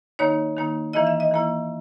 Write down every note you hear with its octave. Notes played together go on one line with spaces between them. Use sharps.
D#3 A#3 D#4 C#5
D#3 A#3 D#4
E3 A#3 E4 D#5
E5
D#5
E3 A#3 E4